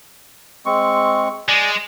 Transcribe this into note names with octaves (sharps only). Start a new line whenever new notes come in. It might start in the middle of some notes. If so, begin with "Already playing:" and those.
G#3 C4 C#6
G#3 D5 G#5